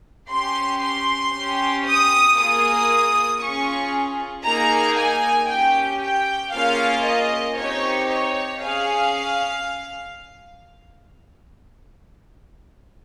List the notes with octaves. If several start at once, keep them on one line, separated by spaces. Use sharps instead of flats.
C#4 G4 C6
C6
C#4 G4
D#6
A#3 F4 G#4 D#6
C#4 F4 G#4 C#6
A#3 D#4 G#4 A#5
G#5
C#4 G4 G5
G5
A#3 C#4 F4 G#4 F5
D#5
C4 D#4 G4 C#5
C#5
C#4 G#4 F5